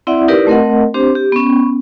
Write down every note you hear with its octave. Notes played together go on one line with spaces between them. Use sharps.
C4 E4 D5 E5 F#5
D#4 E4 G4 A#4 B4 D5
A3 C4 A#4 D#5 F#5
C4 D4 G4 C5
G4
B3 C#4